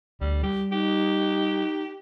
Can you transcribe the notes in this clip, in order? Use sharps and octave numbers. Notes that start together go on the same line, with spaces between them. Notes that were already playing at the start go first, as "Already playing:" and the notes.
D2 G3
G3 G4
D#4 G4